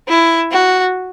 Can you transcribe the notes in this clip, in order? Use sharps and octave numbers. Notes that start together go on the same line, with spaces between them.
E4
F#4